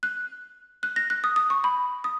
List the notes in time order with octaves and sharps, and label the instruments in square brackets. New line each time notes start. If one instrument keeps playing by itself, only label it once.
[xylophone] F#6
F#6
A#6
F#6
D#6
D#6
C#6
B5
D#6